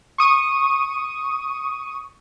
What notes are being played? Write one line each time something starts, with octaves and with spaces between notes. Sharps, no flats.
C#6 D#6 D#7